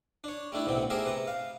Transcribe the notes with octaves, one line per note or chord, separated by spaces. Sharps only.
D4 C#5
G3 A3 D4 E4
B1 A2 C3 F#3 C4
A3 G4 G#4 A#4 C5 E5
C3 B4 A#5
F5